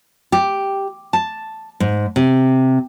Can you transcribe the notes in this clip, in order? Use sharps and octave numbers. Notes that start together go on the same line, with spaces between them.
G4
A5
G#2
C3